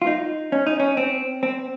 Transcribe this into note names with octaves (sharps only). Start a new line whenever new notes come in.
F4
D#4
C#4
D#4
C#4
C4
C4